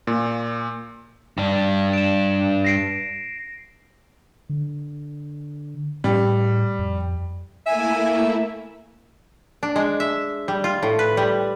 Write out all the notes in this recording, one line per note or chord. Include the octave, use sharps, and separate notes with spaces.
A#2
G2 D4
D7 E7
A#6 C7 D7
D3
A2 G3
F2
A3 A#3 E4 E5 G#5
D4
G#3
E5
G3
F4
A2
B4
G3